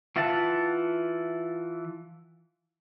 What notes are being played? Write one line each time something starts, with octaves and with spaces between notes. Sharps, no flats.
E3 F4 E5 F#5 A5